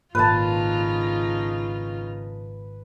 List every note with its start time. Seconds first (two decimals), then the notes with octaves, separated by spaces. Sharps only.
0.15 G#1 A#2 C#3 D#4 F4 B4 A5